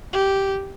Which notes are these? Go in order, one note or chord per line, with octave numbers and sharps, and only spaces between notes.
G4